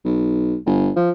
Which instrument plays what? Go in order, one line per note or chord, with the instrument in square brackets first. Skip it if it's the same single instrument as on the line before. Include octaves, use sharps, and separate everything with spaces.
[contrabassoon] B1
G1
F3